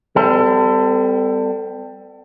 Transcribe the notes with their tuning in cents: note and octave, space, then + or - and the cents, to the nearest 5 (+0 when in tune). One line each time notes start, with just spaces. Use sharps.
G3 +10 C4 -45 A4 +20